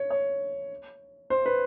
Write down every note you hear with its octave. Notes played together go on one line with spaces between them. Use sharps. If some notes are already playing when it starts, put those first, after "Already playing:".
Already playing: C#5
C#5
C5
B4